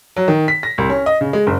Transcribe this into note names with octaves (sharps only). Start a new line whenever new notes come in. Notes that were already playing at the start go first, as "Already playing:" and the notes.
F#3
D#3
B6
A#6
C2
C#4
D#5
C#3
G#3
F#1